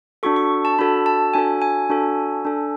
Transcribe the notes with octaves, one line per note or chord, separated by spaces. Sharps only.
D4 F#4 A4 C#6
C#6
A5
D4 F#4 A4 B5
A5
D4 F#4 A4 G#5
G#5
D4 F#4 A4
D4 A4